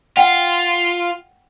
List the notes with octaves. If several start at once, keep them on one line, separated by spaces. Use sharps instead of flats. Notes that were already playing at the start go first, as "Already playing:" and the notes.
F4 F#5 G5